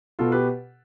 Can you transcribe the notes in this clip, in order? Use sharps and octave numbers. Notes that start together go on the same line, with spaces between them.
B2 F4 A4
G4 B4